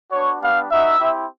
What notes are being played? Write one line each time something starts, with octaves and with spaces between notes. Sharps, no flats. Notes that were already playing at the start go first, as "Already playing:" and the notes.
B3 D4 F#4 C#5
G3 B3 D4 G4 F5
B3 D#4 F#4 E5
C4 E4 G4